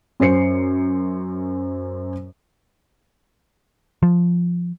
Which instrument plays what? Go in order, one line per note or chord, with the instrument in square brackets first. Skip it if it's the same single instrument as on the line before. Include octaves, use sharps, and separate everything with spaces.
[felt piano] F#2 C#4 C5 C7 C#7
[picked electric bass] F3